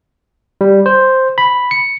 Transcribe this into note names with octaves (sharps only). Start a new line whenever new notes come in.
G3
C5
B5
C#7